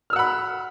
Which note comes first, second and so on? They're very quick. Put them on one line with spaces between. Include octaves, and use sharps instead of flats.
F6 E6 F#5 B5